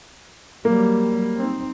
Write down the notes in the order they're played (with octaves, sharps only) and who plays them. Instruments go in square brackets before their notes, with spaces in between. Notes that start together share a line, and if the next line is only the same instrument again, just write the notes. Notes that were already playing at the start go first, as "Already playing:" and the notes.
[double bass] F#3 G3 [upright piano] A#3
[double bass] C4 D#4